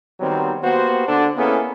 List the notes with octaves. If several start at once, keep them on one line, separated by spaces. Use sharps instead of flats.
D#3 F#3 G3 B3 C4
A#3 B3 F#4 G4 C5
D3 D4 A4
A#3 B3 C#4 E4 G#4 A4